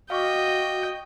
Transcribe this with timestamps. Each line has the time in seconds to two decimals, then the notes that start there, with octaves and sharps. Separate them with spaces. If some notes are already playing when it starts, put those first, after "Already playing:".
0.10 F#4 D#5 F5 G5 C#6 D6